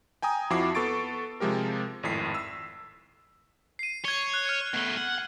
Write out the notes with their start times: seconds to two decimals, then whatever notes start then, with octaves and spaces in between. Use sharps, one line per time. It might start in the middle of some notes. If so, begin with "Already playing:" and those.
0.22 G5 G#5 A#5 D#6
0.50 F2 F3 E4 F#4 D6 C7
0.75 B3 A4 C#6 A6 D7
1.40 C3 F3 G#3 G4 A#4
2.03 G#1 F2 A2 B6 C7
2.34 E6
3.79 C7 D#7
4.05 C#5 G#6 G7
4.34 F#6
4.46 F6 G#6
4.74 B2 A3
4.98 F#5